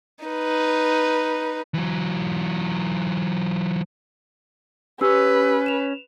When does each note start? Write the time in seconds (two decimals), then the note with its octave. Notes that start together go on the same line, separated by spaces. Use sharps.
0.25 D#4 B4
1.74 E3 F#3
5.01 C#4 G4 B4 E6
5.66 E7 F7